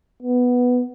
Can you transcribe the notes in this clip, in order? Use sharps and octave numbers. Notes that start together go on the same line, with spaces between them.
B3